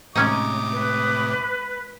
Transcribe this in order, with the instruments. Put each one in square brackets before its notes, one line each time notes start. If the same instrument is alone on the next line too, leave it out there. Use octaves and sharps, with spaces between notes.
[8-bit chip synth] A2 C3 [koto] G#3 C#4 D#4 [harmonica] D6 D#6
[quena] B4